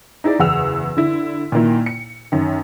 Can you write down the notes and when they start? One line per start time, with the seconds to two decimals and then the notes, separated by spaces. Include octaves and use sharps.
0.24 D#4 E4 G#4 D5
0.39 F#1 E2 G#4 F#5 E6 F7
0.97 D3 E4
1.52 A#2 D#3 A#3 E4
1.86 C#7
2.32 F#2 D#3